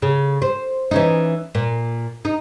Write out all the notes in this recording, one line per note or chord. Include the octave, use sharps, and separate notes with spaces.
C#3
C5
E3 C#4 D#4
A#2
D#4